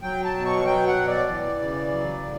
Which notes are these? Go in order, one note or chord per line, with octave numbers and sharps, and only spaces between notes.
F#3 G5
A5
B2
C#6
F#3 G5
F#5
B2
D5
E3
C#3
F#3
A2